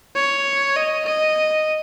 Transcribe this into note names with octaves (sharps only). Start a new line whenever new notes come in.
C#5
D#5
D#5